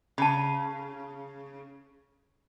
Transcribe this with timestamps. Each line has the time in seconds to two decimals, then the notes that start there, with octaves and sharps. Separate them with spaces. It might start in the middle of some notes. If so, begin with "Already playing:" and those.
0.18 C#3 A5 B5